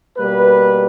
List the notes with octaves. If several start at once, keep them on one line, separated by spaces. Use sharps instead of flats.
B2 G3 A#3 B4